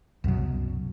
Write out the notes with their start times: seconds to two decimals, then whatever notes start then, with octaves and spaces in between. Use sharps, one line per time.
0.24 C2 F#2 B2 F#3